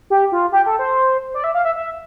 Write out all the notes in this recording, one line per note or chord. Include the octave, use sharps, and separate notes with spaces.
G4
F4
G4
A4
C5
D5
E5
F5
E5
E5